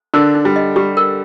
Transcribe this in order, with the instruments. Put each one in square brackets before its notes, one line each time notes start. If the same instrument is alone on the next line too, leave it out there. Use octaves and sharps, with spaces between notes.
[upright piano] D3 D4 [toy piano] A#4
[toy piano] D#4
[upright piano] G3
[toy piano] D#5
[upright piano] G3 [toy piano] G4
[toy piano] A#4